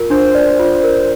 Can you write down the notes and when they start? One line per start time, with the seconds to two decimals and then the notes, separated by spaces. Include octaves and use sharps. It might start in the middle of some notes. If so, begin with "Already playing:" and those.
Already playing: F4 A#4
0.10 D4 C5
0.35 D5
0.59 F4
0.84 A#4